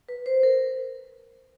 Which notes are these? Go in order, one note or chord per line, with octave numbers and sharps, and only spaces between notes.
B4
C5
A#4